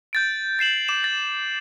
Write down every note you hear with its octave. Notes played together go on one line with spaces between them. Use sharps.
G6 A6 D7
A6 C7 E7 F#7
D6 E7
A6